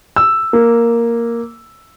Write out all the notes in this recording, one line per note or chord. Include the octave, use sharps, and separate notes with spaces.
E6
A#3